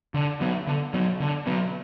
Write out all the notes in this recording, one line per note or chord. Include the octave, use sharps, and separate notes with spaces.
D3
F#3 B3
D3
F#3 B3
D3
F#3 B3